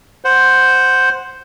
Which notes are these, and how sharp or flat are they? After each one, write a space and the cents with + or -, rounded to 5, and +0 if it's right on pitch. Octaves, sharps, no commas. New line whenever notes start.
C5 +0 F#5 +0